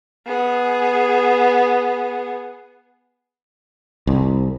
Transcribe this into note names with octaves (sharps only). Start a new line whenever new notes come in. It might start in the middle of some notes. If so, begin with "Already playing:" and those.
B3 G#4
C2